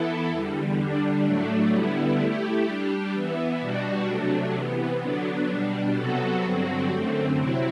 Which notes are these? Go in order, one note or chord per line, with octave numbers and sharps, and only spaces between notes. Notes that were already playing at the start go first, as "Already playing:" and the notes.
Already playing: E3 B3 E4 A4
E2 D3 G3
D3 G3 D4
A2 F#3 A3 D4
D3 G3 B3 E4
A3 E4 G4
G3 D4 G4
E3 B3 E4
B2 G3 D4 F#4
C3 F#3 A3 D4
C3 E3 B3
D3 F#3 B3 D4
B2 G3 D4
C3 F#3 B3 F#4 A4
G2 D3 F#3 C4 F#4
F#2 D3 A3 C4
C3 F#3 C4 E4